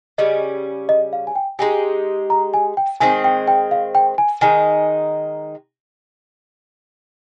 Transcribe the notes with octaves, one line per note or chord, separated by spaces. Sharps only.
C#3 G3 C#4 D#5
D#5
F5
G#5
G5
G#3 D#4 G4 G#5
A#5
G#5
G5
D#3 G#3 C4 G#5
G5
G5
F5
G5
G#5
D#3 G#3 D#4 G#5